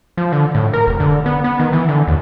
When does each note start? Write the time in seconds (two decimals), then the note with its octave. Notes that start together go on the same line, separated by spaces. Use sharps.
0.17 F3
0.32 D3
0.55 A2
0.73 A#4
0.87 F1
1.00 D3
1.26 B3
1.44 B3
1.60 D#3
1.73 E3
1.89 D3
2.08 D#2